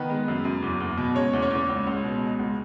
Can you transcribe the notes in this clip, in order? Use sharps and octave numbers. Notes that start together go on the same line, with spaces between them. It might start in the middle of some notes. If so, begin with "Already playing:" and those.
Already playing: D#3 B3 B4
G#3
F#2
F#2
E2
E2
B2
G#3 C#4 C#5
E2
C#4 C#5
E2
C#2
C#2
B2
G#3
C#2